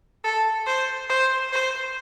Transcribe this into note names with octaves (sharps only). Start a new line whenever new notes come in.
A4
C5
C5
C5